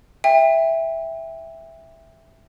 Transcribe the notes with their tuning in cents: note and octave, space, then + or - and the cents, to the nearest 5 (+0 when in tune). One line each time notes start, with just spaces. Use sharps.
E5 +0 G5 +25